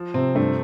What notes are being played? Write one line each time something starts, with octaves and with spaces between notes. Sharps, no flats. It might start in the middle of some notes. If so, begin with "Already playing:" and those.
Already playing: F3
C3 C4
G2 A3